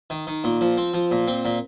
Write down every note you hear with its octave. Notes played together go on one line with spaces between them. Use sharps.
D#3
D#3
A#2
F3
C4
F3
A#2
C4
A#2